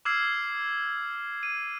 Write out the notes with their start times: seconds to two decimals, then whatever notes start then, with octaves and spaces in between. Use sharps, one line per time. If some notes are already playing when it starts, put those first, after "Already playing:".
0.05 D6 E6 F6 G#6 C7
1.43 D#7